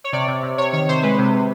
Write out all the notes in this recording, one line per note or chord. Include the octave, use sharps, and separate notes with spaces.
C#5
C3 D5
C3
C3
C3 C#5
D#3 C#5
C3 C5
G#3 B4
C3
C3